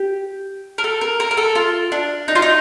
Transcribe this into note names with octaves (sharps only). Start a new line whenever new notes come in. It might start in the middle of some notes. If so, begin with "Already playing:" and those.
Already playing: G4
A#4
A4
A#4
A#4
A#4
A4
F4
D4
D#4
F4
D#4